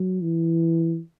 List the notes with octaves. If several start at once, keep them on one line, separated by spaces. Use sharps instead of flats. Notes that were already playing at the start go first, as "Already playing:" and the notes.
Already playing: F#3
E3